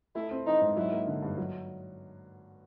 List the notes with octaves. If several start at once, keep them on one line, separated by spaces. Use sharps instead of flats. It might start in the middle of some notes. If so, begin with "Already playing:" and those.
A3 E4
C4
E3 D#4
G#2
F#3 E4
A#3
D3
G2
F#3